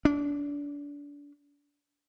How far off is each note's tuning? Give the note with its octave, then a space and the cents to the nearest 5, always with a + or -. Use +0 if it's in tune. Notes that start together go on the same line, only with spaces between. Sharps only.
D4 -30